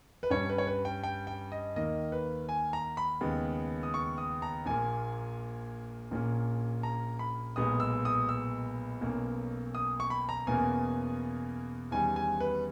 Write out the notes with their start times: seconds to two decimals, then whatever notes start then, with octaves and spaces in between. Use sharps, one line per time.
0.23 B4
0.30 G2 G3 C#4 C#5
0.49 B4
0.58 C#5
0.67 B4
0.85 G5
1.03 G5
1.27 G5
1.52 D#5
1.76 D#2 D#3 A#3 D#5
2.12 B4
2.49 G#5
2.73 A#5
2.97 B5
3.21 D#2 C#3 G#3 B3
3.83 D#6
3.94 C#6
4.18 D#6
4.42 A#5
4.66 A#1 A#2 A#3 G#5
6.11 A#1 A#2 A#3 C#4
6.83 A#5
7.19 B5
7.56 B1 A#2 G#3 B3 D#6
7.80 E6
8.05 D#6
8.29 E6
9.01 B1 B2 A#3 C#4
9.75 D#6
10.00 C#6
10.10 B5
10.29 A#5
10.47 E2 B2 A#3 C#4 G#5
11.91 E2 D#3 G3 C#4 G#5
12.16 G#5
12.40 B4